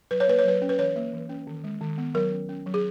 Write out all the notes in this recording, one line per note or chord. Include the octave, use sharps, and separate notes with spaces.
F#3 B4
C#5
A#3 B4
C#5
F#3 B4
C#4
B4
E3 C#5
A#3
E3
C#4
D#3
G#3
D#3
B3
F#3 A#4
C#4
C#4
F#3
G#4